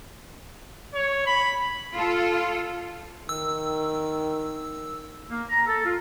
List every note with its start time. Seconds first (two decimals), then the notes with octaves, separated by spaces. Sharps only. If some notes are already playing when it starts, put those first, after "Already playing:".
0.94 C#5
1.26 B5
1.95 F4 A4
3.29 D#3 E6
5.30 A#3
5.48 A#5
5.66 A4
5.86 F4